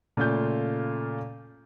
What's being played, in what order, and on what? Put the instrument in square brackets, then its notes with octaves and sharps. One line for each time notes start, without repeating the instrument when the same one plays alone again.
[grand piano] A#2 C#3 A3 F4 F5 G6